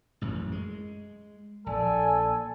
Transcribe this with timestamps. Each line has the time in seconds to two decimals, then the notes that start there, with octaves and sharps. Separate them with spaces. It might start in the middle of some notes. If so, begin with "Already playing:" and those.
0.21 A1 F#2
0.52 G#3
1.66 A#1 A4 D5 G#5